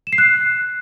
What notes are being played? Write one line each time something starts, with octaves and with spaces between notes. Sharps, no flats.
E7
C7
F#6